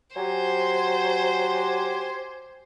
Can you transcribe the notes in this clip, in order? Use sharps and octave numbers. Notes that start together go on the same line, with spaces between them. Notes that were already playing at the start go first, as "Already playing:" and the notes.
F#3 G4 C5 G#5